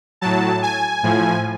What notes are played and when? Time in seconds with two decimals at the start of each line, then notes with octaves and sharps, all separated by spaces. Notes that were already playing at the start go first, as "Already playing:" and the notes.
0.21 A2 F#3 A5
0.62 G#5
1.03 A2 F3